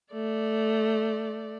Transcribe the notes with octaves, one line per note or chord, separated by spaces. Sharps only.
A3 D5